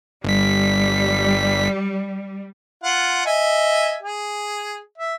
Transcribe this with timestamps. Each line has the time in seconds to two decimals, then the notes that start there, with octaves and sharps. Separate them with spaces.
0.24 G1 G3 B6
2.84 F4 F#5
3.26 D#5 E5 G#5
4.03 G#4
4.98 E5